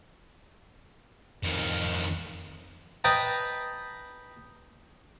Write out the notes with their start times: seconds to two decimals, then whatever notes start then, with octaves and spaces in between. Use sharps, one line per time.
1.43 F2 D#3
3.04 B4 D#5 G5 A5 A#5